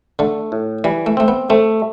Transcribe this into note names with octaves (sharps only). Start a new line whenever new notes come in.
D3 A3
A2
E3 G3
A3
A3 C4
B3
A3 C4